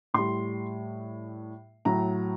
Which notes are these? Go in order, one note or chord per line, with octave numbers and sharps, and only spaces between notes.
A2 G3 C6
A2 F#3 A#5